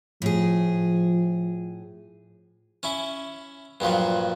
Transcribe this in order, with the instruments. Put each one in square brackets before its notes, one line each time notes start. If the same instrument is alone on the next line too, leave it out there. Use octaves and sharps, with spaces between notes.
[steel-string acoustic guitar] A2 G#4 [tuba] F3
[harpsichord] C#4 E4
G2 A#2 F3 F#3